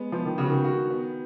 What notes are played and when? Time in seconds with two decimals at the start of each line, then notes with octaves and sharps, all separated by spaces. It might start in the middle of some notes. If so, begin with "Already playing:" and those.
Already playing: G#3 B3
0.12 F3 B3
0.25 D#3
0.38 C#3 F#4
0.50 D#3
0.64 F#4
0.90 B3